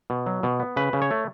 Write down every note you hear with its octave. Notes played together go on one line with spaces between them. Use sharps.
B2
F#3
B2
B3
C#3 B4
C#3
C#5
A3